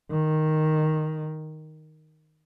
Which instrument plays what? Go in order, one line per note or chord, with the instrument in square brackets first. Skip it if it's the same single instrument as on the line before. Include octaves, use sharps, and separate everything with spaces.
[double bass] D#3